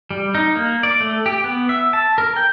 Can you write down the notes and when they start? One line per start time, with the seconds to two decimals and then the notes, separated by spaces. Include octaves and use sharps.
0.10 G3
0.35 D#4
0.55 A#3
0.83 D5
1.00 A3
1.26 G4
1.44 B3
1.69 E5
1.93 A5
2.18 A#4
2.36 G5